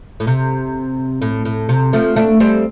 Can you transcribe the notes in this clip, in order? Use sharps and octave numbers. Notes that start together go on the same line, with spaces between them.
A2
C3
A2
A2
C3
F3 A3
A3 D4
G3 C4